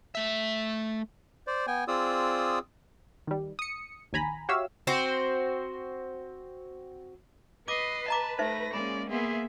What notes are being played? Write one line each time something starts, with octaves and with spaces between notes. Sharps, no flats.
A3 E5
C5 D5
B3 G5 G#5
C4 F4 G#4 D5 D#6 E6
D#3 G3
D#6 C#7
A#1 D#2 G#5 A#5 B5
F#4 G4 C#5 E5 F5 E6
C4 F#4 C5
B4 D#5 D6 C7
D#5 A5 A#5 D6
A3 D#4 C5 E5 A#6
G#3 A#3 C#4 D5 B5
A#3 B3 G#4 E5 C6